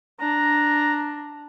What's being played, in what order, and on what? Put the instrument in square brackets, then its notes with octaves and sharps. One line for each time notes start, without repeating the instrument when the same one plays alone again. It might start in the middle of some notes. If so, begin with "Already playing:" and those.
[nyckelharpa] D4 [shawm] A#5